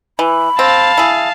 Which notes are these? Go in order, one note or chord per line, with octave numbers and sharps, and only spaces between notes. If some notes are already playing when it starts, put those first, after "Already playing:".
E3 B5
C4 F5 A5
E4 G#4